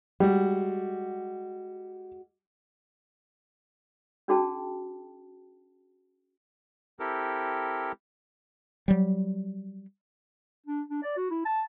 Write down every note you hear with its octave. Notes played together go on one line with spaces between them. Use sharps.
G3 G#3 F#4
C#4 D4 F#4 G#4 G5 A5
C4 E4 G4 A4 A#4
F#3 G3
D4
D4
D5
F#4
E4
A5